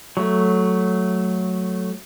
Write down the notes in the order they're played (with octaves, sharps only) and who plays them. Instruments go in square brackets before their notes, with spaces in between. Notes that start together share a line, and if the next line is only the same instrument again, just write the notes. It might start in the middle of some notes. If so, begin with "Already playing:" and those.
[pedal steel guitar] F#3 A3